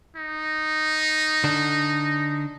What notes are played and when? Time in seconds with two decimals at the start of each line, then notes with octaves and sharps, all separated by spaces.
0.16 D#4
1.44 D3 D4